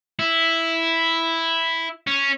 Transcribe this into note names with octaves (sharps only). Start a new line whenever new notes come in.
E4
C#4